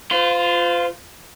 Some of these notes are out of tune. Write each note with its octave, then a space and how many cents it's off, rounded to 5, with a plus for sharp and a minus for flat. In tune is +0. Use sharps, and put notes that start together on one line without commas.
F4 +0 C5 -35